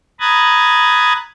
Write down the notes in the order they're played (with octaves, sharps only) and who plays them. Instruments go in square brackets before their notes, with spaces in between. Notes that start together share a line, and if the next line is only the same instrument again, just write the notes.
[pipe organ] A#5 B5 D#6 F#6 G#6 A6